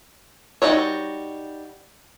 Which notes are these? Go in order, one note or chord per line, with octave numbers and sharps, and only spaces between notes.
G3 D#4 E4 F#4 C#5